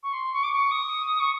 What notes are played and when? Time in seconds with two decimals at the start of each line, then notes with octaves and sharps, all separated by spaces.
0.03 C#6
0.13 C6
0.33 C#6
0.43 D6
0.52 C#6
0.71 D#6
1.20 C#6